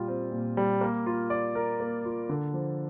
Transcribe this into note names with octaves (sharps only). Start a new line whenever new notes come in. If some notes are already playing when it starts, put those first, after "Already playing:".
Already playing: A#2 G3 F4
C4
A#2
G3
A#3
F4
D5
A#4
A#3
F4
D3
F3